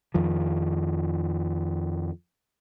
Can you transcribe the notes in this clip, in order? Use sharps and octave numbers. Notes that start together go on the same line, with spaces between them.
F2 D#3 F3